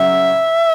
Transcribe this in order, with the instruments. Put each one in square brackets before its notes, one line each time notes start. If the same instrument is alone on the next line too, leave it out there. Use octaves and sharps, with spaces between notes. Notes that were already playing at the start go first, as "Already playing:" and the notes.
Already playing: [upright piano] C#3 F#3 C#4 [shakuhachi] E5